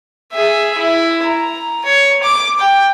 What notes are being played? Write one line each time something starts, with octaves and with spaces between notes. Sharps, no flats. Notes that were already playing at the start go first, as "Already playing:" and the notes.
G#4 E5
E4
A#5
C#5
D6
G5